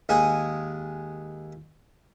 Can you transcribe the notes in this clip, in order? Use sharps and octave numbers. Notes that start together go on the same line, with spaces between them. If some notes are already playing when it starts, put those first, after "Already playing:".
D#2 G#3 G#4 G#5